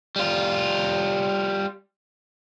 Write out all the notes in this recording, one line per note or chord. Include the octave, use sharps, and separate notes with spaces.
G3 F4